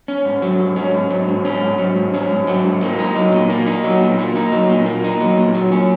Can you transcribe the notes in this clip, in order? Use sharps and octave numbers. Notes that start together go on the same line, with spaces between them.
C#4
G#2
F#3
G#2
C#4
G#2
F#3
G#2
C#4
G#2
F#3
G#2
C#4
G#2
F#3
G#2
A#3
D#4
F#3
A#2
A#3
D#4
F#3
A#2
A#3
D#4
F#3
A#2
A#3
D#4
F#3
A#2
F#3
C#4